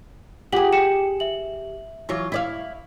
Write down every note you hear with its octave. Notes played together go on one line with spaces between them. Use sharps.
F4 G4 G#4 F#5 F#7
G5 C#7 E7
E5 F#7
E3 F#3 F4
E4 D5 F5